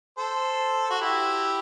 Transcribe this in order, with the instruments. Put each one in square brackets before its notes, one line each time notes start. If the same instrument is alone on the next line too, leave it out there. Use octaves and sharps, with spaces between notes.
[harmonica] A4 C5
F#4
E4 G4